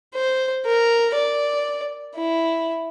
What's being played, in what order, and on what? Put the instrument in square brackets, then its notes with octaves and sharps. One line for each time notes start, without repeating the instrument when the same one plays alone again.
[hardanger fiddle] C5
A#4
D5
E4